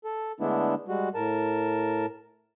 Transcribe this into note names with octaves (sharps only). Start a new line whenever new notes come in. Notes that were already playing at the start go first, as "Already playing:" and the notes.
A4
D3 G#3 A3 B3 D4 E4
G3 G#3 F#4
A2 A#4 A5